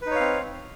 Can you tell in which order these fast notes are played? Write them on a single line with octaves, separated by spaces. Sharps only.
B4 D#4 C#5 F5 C4